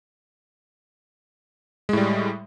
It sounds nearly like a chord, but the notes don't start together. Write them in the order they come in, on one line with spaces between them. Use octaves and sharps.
G#3 A2 G3